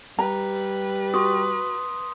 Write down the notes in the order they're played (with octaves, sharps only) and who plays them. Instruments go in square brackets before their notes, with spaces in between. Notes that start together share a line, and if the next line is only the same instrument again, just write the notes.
[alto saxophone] G3 [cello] B4 [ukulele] A#5
[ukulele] F#4 [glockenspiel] C6 D#6